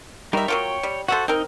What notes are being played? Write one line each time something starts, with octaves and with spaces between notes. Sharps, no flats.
D#3 G3 D#4 A#4 E5
F#3 A#3 F4 C#5 G5
G3
F#4 A4 C5 E5 F#5
C4 D#4 A#4